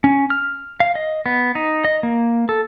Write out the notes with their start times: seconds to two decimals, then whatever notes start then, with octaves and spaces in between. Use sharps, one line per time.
0.04 C#4
0.30 F6
0.80 F5
0.95 D#5
1.26 B3
1.55 D#4
1.84 D#5
2.03 A#3
2.49 A4